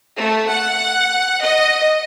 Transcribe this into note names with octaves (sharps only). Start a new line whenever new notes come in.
A3
F#5
D#5